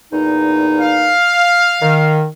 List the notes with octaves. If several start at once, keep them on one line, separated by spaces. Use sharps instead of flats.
E2 A#2 D#4
F5
D#3